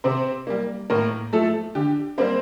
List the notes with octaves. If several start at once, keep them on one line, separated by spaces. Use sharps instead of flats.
C3 C4 C5
G3 A#3
A2 A#3 A#4
F3 A3 A4
D3 G4
G3 A#3 C4 C5